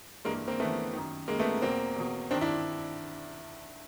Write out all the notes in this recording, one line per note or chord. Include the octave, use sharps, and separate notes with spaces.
G2 E3 G#3 A#3
A#3 C4
G2 E3 A3 B3
F#2 D#3
F#2 D#3 G#3 A#3
A3 B3
E2 B2 A#3 C4
E2 B2
G2 D#3 C4 D4
D4 E4